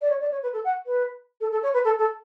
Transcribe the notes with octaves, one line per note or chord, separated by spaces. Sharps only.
D5
C#5
D5
C#5
B4
A4
F#5
B4
A4
A4
C#5
B4
A4
A4